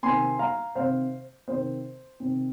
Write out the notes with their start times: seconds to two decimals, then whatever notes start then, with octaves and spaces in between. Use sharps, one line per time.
0.03 C3 D#3 C4 G#5 C6
0.39 F5 A#5
0.75 C3 D#3 C4 C5 F5
1.48 C3 D#3 C4 C5
2.20 C3 D#3 C4